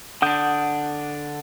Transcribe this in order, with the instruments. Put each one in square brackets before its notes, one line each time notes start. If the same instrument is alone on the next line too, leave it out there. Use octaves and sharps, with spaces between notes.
[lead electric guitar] D3 D4 [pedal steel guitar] F#5 D#6 G6